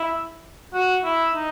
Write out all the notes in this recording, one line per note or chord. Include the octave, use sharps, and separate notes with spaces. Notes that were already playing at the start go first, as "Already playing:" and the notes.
Already playing: E4
F#4
E4
D#4